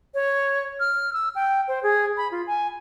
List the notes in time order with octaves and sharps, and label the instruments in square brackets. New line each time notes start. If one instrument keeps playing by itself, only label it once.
[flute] C#5
F6
E6
G5
C5
G#4
B5
F4
G#5